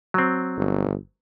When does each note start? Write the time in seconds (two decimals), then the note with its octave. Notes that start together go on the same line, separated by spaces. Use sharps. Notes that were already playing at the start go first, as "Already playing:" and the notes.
0.14 F#3 C4
0.57 G1